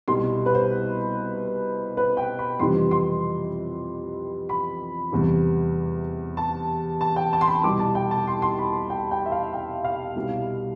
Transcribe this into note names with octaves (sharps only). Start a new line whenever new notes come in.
C2 B2 G3 C6
B4
C5
B4
G5
B5
F2 C3 E3 G3 C6
C6
B5
E2 C3 E3 G3
A5
A5
G5
A5
C6
B5
C2 B2 G3 D6
A5
G5
A5
C6
C6
B5
G5
G5
E5
F5
G5
F5
C2 B2 G3